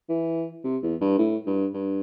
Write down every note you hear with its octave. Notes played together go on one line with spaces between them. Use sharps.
E3
C3
E2
G2
A2
G2
G2